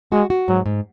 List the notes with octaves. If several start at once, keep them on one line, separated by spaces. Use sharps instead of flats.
G#3 F#4
F#4
G#2 F#3
G#2